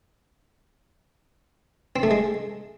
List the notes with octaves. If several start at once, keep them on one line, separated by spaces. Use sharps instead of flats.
C4
A3
G#3